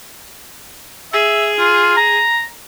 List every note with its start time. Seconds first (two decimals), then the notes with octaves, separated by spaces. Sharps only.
1.13 G#4 E5
1.59 F4
1.97 A#5